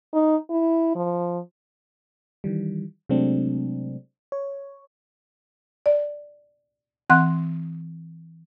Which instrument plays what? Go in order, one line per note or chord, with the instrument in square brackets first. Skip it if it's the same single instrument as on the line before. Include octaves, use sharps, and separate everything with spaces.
[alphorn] D#4
E4
F3
[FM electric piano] D#3 E3 G3
C3 F#3 G#3 A3 C4 D4
C#5
[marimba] D5
E3 C4 F#5 C6 F#6